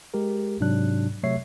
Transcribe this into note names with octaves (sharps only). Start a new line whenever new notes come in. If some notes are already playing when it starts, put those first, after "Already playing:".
G#3 G4 A#4
G#2 C3 F#3 D4 F#6
C3 F#3 A3 C#5 E5 C7